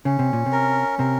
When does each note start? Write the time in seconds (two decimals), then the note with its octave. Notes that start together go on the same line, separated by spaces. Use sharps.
0.05 C#3 C#4
0.19 C3
0.33 A#2
0.46 C3
0.52 A#4
0.99 C3 A#4